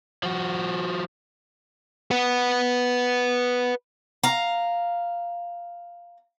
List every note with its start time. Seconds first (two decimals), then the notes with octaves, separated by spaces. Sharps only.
0.23 F3 F#4
2.11 B4 F#5
4.23 F5 A#5